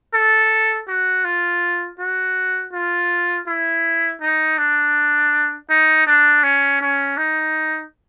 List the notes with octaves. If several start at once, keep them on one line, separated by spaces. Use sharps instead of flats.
A4
F#4
F4
F#4
F4
E4
D#4
D4
D#4
D4
C#4
C#4
D#4